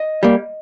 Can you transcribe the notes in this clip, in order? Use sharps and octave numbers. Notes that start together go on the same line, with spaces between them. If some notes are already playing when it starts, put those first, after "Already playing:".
Already playing: D#5
G3 A#3